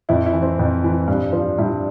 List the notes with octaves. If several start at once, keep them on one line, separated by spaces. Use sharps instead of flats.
F2 E4
E4
E3
C4
F2
E3
G2
F3
G2 E4